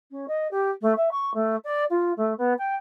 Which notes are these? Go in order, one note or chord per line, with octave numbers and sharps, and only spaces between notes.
C#4
D#5
G4
A3
E5
C#6
A3
D5
F4
A3
B3
G5